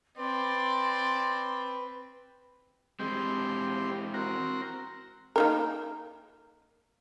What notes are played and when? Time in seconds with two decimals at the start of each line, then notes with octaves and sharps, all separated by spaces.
0.18 C4 B4 D5 C6
3.00 E3 G#3 C4 G4
4.14 C4 F#4 A#4
5.36 A#3 D#4 A#4